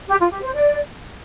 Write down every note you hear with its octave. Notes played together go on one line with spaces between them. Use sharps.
G4
F4
G4
C5
D5